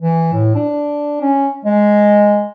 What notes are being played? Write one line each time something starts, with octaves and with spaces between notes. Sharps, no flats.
E3
A2
D4
C#4
G#3